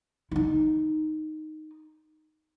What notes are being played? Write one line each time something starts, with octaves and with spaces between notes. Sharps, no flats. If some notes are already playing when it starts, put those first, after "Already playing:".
D#4 E4